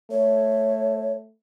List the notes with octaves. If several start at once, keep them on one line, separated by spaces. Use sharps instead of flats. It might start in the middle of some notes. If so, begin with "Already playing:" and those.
A3 C#5